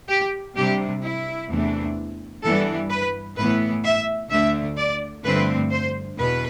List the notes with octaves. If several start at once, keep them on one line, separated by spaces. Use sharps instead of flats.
G4
C3 G3 D4 G4
E4
E2 C3 E3 A3 D4
G2 E3 G3 B3 D4 A4
B4
A2 E3 B3 B4
E5
D2 D3 A3 E5
D5
G2 D3 F3 A3 C4 B4
C5
E2 B2 B4